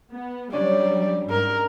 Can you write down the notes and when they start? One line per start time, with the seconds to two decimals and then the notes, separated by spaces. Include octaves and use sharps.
0.12 B3
0.53 F#3 G3 C#4 D4 D5
1.30 G#2 A#4